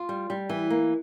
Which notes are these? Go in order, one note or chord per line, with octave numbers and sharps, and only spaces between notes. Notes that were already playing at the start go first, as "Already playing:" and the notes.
Already playing: F4
G3
G3
E3
A#3